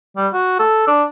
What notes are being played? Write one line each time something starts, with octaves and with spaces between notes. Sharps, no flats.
G3
F#4
A4
D4